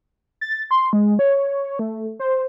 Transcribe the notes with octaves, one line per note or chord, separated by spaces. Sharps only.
A6
C6
G#3
C#5
A3
C5